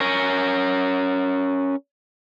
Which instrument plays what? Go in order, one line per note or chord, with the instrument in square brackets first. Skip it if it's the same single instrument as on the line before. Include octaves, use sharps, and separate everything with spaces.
[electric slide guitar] C#4 A#4